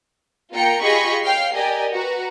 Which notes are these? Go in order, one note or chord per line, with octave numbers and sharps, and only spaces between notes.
A#3 F4 G5 A#5 C#7
F4 G4 G#4 D#5 B5 C#6
C#5 F5 G5 F6 C7
G4 A#4 D5 D#5 G#5
F#4 B4 A#5